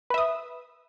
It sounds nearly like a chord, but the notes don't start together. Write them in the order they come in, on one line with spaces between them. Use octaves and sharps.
B4 E5 D#6